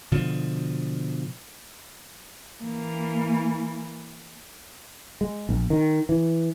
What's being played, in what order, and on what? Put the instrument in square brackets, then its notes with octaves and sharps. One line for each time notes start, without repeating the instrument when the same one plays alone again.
[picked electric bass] B2 D3 F3
[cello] E3 A#3
[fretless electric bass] G#3
A#1
D#3
E3